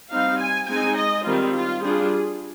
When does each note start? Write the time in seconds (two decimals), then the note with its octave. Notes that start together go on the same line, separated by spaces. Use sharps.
0.11 G3 C4 D#4 F5
0.39 G#5
0.68 G#3 C4 D#4 G#5
0.97 D#5
1.25 D#3 G3 C4 F4
1.54 F4
1.83 G3 D4 F4 G#4